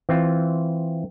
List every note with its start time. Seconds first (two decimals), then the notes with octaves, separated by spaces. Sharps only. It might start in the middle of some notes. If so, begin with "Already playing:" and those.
0.09 E3 C4 F4